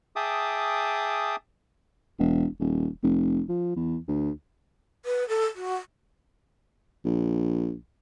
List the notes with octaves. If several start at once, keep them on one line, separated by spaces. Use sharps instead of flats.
G#4 E5 G5 A5 D6 D#6
E1
D#1
F1
F3
E2
D2
B4
A4
F#4
A#1